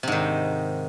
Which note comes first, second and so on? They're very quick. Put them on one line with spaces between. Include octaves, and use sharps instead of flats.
C3 G#2 D#3